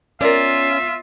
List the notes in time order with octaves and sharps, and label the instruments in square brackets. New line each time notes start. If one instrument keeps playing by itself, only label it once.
[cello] B3 F4 [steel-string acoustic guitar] C#4 [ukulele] A#4 D5 [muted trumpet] E5